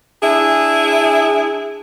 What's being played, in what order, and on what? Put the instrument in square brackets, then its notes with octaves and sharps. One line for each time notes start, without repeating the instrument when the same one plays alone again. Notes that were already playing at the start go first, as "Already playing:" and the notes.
[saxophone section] D4 E4 G#4